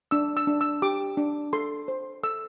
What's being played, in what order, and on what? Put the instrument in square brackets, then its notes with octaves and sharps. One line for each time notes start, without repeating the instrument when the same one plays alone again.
[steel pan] D4 E6
E6
D4
E6
G4 D6
D4
A4 C6
C5
A4 E6